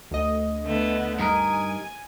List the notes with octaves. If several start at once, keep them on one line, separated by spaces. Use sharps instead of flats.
D2 D#5
D3 A3 B3
G2 D#4 A#4 G#5